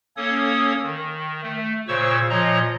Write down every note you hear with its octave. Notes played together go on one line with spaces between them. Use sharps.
A#3 C#4 A4 C#5 D#6
D#3
A3
A#2 C#3 C5 C#5 C#6 E6
A#2 F3 C#5 D#5 A#5